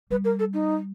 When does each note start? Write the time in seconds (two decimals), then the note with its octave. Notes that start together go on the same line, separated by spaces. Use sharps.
0.10 G3 B4
0.25 A#4
0.39 A4
0.54 D#4